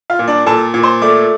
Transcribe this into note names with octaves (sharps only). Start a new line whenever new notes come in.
F4 F5
A#2
D4 D5
A#2 A4 A5
A#2
C5 C6
A3 D5 D6